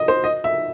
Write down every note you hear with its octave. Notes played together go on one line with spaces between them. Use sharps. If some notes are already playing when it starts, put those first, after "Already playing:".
Already playing: D#5
C5
D#5
E5